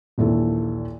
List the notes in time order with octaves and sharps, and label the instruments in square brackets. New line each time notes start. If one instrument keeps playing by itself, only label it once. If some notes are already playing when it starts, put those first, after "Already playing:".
[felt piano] A#1 D#2 A#2 E3 E4 A4